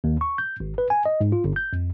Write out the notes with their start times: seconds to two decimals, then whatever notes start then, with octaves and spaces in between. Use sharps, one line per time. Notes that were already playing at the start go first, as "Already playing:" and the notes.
0.04 D#2
0.21 C#6
0.38 G6
0.60 G#1
0.78 B4
0.90 G#5
1.06 D#5
1.21 G#2
1.32 F4
1.44 G1
1.56 G6
1.73 F2